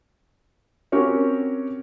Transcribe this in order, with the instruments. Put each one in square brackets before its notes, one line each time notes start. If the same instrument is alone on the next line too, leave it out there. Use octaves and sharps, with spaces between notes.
[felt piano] C4 C#4 F#4 G4 A#4 C#5